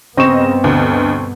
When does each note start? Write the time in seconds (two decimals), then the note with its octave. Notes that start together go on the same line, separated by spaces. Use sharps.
0.17 G2 C#3 B3 C4 D#5 C#6 E7
0.64 D2 B2